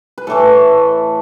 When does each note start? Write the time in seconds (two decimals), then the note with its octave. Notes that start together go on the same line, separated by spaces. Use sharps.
0.18 B4
0.27 A2 E3 A3 A4